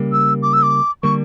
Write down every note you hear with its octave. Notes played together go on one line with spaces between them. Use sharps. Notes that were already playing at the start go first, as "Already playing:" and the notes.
Already playing: C#3 G3 A#3
E6
D6
E6
D6
D3 G3 A#3 C#6